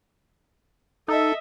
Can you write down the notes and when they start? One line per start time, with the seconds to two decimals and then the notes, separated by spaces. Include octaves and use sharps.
1.08 D#4 A4 D#5 E5